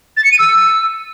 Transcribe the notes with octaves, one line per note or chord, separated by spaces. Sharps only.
A6
C#7
D#7
E6